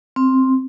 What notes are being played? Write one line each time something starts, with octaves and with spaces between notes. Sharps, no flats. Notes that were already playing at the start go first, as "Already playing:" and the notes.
C4